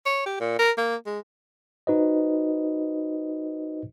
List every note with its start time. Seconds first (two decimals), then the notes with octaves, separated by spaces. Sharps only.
0.06 C#5
0.26 G4
0.40 A#2
0.59 A#4
0.77 A#3
1.06 G#3
1.87 D#4 F#4 B4 C5 D#5